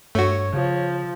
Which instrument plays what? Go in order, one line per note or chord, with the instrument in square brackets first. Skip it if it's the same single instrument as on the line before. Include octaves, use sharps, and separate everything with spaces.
[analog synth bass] G2 [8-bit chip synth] A3 F#4 [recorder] C#5
[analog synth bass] C#3 [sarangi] F3